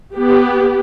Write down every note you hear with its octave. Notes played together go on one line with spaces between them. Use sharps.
B3 G4